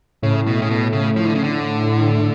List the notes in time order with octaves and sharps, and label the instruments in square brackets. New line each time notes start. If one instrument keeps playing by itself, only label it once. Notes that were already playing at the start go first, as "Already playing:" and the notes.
[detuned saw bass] A2 [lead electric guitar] C#3
[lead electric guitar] B2
C#3
B2
C#3
F3
D3
C#3
D3